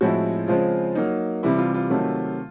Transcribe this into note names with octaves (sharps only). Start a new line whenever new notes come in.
A2 F3 G#3 C4 E4 F#4
C#3 F3 G#3 C4 F4
F#3 A#3 D#4
C3 E3 G3 E4
F4
F4
C3 D#3 F#3 A3